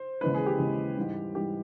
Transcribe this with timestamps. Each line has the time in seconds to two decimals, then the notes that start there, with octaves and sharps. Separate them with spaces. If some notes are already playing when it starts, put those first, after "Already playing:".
Already playing: C5
0.21 D#2 C#3 E3 G#3 B4
0.34 G#4
0.46 G4
0.59 D#2 C#3 E3 G#3
0.97 G#2 E3 G3
1.35 G#2 E3 G3 G4